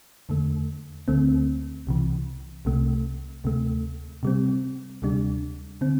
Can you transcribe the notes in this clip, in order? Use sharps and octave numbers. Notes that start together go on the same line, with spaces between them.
E2 D3 A3
D2 D3 A3 C4
C2 C3 E3
C2 C3 A3
D2 C3 A3
C3 G3 C4
D2 C3 G3 D4
D3 C4